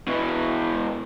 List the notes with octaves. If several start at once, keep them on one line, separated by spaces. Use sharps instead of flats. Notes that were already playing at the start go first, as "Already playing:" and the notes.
B2 E3